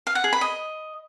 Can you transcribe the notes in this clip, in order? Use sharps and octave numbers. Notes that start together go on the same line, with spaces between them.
F5
F#5
G#4
B5
D#5